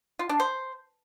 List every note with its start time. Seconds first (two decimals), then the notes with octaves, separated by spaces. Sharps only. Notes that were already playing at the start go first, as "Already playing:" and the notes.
0.19 F4
0.29 D4
0.40 C5